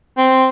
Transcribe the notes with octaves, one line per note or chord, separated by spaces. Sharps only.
C4